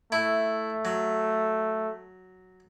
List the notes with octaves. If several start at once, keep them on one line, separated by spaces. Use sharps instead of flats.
A3 E4
F#3